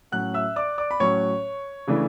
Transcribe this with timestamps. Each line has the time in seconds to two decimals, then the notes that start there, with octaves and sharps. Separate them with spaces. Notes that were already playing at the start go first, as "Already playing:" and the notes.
0.12 A2 F#3 C#4 F#5 F#6
0.34 E5 E6
0.56 D5 D6
0.78 D5 D6
0.91 B5
1.00 A2 F#3 C#4 C#5 C#6
1.87 C#3 E3 A3 D4